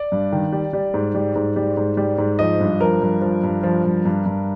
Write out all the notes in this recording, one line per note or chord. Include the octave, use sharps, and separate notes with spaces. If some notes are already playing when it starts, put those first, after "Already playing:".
Already playing: D5
G2
D#3
G3
G3
G#2
G3
G#2
G3
G#2
G3
G#2
F3 D#5
G2
F3 A#4
G2
F3
G2
F3
G2
G2
G2